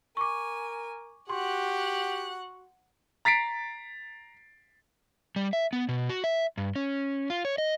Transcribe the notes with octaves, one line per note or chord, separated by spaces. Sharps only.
A#4 G#5 C#6 D6
F#4 G4 F#5 C6 F#6
A#5 A6 B6 C7 D7
G3
E5
B3
B2
F#4
E5
G2
C#4
F4
C#5
D#5